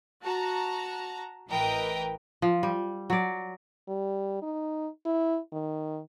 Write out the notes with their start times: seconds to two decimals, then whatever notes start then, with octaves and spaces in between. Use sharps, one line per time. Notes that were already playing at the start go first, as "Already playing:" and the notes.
0.22 F#4 A5 A#5
1.48 A1 E3 A#4 B4 D#5 G5
2.42 F3
2.63 G3
3.10 F#3 D5
3.88 G3
4.42 D#4
5.06 E4
5.53 D#3